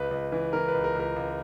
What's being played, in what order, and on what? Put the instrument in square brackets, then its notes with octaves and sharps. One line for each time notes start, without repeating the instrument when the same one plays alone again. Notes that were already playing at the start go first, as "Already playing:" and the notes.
Already playing: [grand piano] C#2 B4
C#2
E3
E3 A#4
B4
C#2
A#4
C#2 A#4
C#2